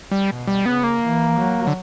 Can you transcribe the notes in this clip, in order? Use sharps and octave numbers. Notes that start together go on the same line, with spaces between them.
G3
B2
G3
C#3 B3
A#3
E3
F#3
D3